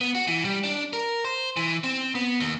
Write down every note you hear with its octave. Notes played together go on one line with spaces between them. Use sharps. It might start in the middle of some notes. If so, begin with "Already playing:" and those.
B3
F#4
E3
G3
D4
A#4
C5
E3
C4
B3
D#2